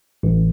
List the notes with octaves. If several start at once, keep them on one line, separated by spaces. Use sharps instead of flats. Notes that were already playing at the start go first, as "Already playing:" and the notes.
A1